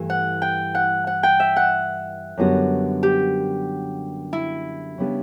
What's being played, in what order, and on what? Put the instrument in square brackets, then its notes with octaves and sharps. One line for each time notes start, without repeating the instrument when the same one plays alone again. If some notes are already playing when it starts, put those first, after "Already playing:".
Already playing: [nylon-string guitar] G2 E3 A3
[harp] F#5
G5
F#5
F#5
G5
E5
F#5
[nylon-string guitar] F#2 D3 G3 B3 F#4
[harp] G4
E4
[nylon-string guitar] C#3 G3 B3 D4